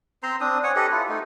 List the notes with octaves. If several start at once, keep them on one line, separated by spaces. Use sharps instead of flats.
C4 C5 A#5 C6
C4 D4 D#6
C#5 F#5 G#5 D#6
G4 A4 B4 D#5
E4 F4
A3 D#4